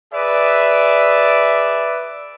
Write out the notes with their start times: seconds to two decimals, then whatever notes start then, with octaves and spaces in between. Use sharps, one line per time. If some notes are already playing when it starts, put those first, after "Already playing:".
0.13 G#4 B4 D5 E5